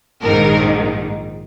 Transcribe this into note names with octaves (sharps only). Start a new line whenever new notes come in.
A#1 G#2 D#3 A#4